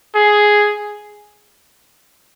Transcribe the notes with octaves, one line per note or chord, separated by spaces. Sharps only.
G#4